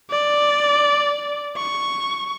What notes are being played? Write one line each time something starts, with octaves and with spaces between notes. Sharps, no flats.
D5
C#6